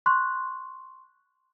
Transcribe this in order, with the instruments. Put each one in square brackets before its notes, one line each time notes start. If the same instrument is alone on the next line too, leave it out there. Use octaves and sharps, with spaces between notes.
[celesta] C6 C#6 F#6